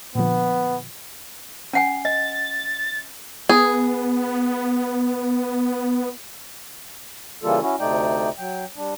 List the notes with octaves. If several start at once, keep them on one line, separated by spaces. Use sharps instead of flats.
A#2 D3 F3 B3
C#4 F#5 G#5
D#5 A6
B3 G#4
C#3 E3 G3 A#3 F4 A4
C#4 E4 F#4
D2 C3 A3 D#4 D5 G5
F#3 G5
G3 D4